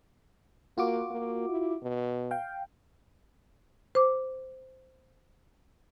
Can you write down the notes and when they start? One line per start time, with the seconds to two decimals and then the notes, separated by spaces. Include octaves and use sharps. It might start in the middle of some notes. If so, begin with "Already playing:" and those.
0.78 A#3 F4 F#4 D6
1.11 A#3
1.49 E4
1.82 B2
2.31 F5 G5
3.95 C5 D6